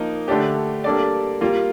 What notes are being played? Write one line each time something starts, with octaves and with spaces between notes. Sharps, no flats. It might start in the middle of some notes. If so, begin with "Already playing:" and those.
Already playing: F3 A#3 D#4
D3 A3 D4 G4
G3 A#3 D4 A4 D5
G3 A#3 F4